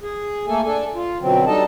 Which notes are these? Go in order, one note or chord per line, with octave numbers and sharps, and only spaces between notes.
G#4
A3 A#3 A4 G#5
D4 A4 G#5
F4
F#2 B2 D3 F#3 C4
G3 D4 D#4 A4 D#5 A5